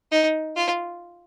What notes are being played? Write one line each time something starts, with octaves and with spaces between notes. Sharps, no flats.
D#4
F4